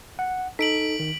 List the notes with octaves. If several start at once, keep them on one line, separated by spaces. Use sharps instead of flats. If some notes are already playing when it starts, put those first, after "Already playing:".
F#5
D#4 A4 B6 D7 F#7
D#3